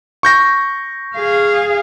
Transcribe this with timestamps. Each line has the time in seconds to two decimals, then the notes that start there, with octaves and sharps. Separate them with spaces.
0.23 C#6 G6 A#6
1.15 G#4 F5